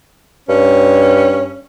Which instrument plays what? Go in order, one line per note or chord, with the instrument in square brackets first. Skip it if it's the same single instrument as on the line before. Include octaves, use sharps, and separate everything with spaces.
[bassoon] G2 [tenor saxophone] C#4